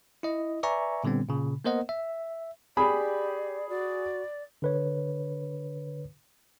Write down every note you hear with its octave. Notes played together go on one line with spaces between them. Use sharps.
E4 D#5
B4 D5 E5 G#5 A#5 C#6
A#2 D3 G3 B3 C4
A#2 C#3
A#3 B3 A#4 C5 D#5 F#5
E5
G4 G#4 D5 B5
F#4 D5
D3 B4 C#5